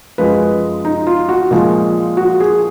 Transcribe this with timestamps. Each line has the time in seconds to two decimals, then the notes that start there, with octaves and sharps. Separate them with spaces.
0.18 F#2 F3 G#3 B4
0.85 D#4
1.07 F4
1.29 F#4
1.51 A#2 F3 G#3
2.17 F#4
2.40 G#4